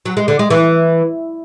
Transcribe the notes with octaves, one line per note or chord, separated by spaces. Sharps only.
F#3
G#3
D3
G#3
E3